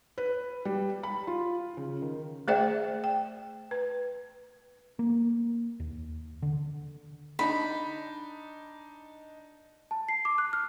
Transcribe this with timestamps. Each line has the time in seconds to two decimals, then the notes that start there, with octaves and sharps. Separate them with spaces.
0.18 B4
0.65 G3
1.03 B5
1.27 F4
1.77 C#3
2.02 D#3
2.48 A3 G#4 C5 D5 E5 G5
3.04 G5
3.71 B4
4.99 A#3
5.80 D#2
6.42 D3
7.39 D4 D#4 B5
9.91 A5
10.09 C7
10.25 D6
10.38 F#6
10.53 F6